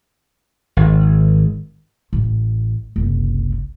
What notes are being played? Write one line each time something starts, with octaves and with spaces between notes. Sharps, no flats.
G#1
A1
F#1 C2